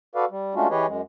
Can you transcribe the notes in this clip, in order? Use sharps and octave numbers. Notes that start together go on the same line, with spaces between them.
F#4 A4 B4 D5 F5
G3
G#3 A3 C#4 D4 F4 F#4
E3 G4 G#4 B4 C#5 D#5
F#2 G#3